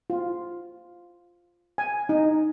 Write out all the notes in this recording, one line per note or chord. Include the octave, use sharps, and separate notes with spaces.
F4
G#5
D#4